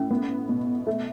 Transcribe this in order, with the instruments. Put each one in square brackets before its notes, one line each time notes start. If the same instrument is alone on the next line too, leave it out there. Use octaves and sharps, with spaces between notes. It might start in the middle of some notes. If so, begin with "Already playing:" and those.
Already playing: [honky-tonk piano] A2 [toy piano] C#4
[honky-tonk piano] B3
B2
A3